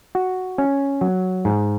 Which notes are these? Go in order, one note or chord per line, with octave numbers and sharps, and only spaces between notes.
F#4
C#4
F#3
G#2